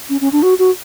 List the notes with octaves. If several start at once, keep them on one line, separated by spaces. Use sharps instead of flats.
C#4
C#4
D4
F#4
F#4